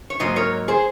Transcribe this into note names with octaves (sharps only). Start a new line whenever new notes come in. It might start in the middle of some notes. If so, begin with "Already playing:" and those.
C#5
G#2 F#3 A#3 C5 D#5
A#4 C#5
G#4 C5